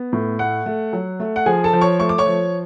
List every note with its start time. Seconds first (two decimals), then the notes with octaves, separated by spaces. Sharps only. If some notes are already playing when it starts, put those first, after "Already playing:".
Already playing: B3
0.13 A2
0.39 A3 F#5
0.66 A3
0.93 F#3
1.20 A3
1.36 F#5
1.46 F3 G#4 G#5
1.64 A4 A5
1.73 F3
1.81 C#5 C#6
2.00 A3 C#6
2.09 D6
2.18 C#5 C#6
2.26 F3